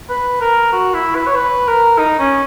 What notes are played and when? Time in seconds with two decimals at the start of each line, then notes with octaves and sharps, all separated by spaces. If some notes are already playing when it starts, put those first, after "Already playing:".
0.10 B4
0.41 A#4
0.73 F#4
0.94 E4
1.15 B4
1.27 C#5
1.35 B4
1.68 A#4
1.98 D#4
2.20 C#4